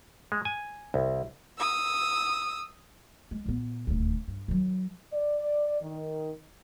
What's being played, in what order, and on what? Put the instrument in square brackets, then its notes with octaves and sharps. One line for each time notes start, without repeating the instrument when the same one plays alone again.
[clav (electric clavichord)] G#3
G#5
C2
[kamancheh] D#6 E6
[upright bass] G#3
A#2 B3
D#1 D2
G2
D#3 F#3
[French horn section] D5
D#3